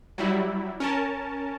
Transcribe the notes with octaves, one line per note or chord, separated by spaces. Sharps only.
F#3 G3 E4
C#4 A#4 A5